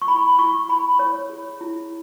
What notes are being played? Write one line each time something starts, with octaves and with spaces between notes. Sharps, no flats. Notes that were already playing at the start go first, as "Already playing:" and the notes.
C#6
E4 B5
E4 C#6
E4 B5
E4 C#5
G#4
E4